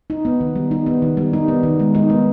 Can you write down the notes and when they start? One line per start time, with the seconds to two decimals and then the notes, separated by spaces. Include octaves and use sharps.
0.10 D#4
0.25 B3
0.41 D#3
0.55 G3
0.71 D#4
0.86 B3
1.02 D#3
1.17 G3
1.33 D#4
1.48 B3
1.63 D#3
1.80 G#3
1.95 D#4
2.10 B3